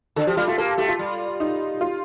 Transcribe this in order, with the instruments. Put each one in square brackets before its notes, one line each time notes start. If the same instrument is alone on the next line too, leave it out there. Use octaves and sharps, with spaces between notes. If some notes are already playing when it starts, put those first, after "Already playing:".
[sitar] D3 [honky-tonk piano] A4
[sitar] F3 [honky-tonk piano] G4
[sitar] G3 [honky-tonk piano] F4
[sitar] A3 [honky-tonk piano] F4
[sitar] A#3 [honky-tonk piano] A4
[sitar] A3 [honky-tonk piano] G4
[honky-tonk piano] F4
[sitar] G3
[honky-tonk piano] D#4
F4